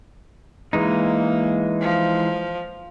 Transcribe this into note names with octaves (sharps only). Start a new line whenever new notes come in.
E3 G#3 A#3 D#4
F3